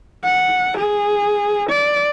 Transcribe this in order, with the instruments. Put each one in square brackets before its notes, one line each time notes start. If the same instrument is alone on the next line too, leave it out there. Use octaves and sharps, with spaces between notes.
[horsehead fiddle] F#5
G#4
D5